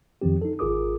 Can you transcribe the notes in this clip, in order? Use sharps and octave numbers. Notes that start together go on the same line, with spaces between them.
F2 D#3 F3 C4 G4
D#4 A4
G#1 F4 G#4 A#4 D6 D#6